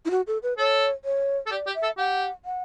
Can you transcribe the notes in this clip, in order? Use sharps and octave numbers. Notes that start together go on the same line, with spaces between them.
E4
F#4
A4
B4
A4 C#5
C#5
A4
G4 D5
G4
E5
A4
G4 F#5
F#5